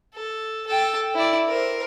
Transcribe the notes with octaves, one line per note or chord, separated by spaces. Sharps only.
A4
A4 G5
E4 D5
A#4 C5